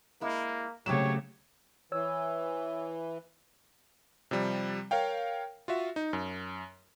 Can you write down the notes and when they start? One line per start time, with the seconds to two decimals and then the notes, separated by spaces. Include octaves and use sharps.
0.21 G#3 A#3 E4
0.86 A#2 C#3 F#3 A3 C4 G4 C#5 E7
1.92 E3 C#5 E6
4.31 C3 F3 G3
4.91 A#4 C#5 F5 G5
5.68 F4 F#4 E5
5.96 D#4
6.13 F#2